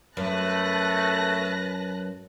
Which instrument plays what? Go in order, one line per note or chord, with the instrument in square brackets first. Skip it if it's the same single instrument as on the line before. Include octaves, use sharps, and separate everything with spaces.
[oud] F#2 [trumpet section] A3 [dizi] B4 [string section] A5 F#6 A#6